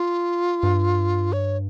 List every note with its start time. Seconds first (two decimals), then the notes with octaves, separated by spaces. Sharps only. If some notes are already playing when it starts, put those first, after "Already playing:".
Already playing: F4
0.63 G2
1.33 C#5